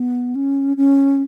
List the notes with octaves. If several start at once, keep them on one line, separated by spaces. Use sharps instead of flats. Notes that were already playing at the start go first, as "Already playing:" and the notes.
Already playing: B3
C#4
C#4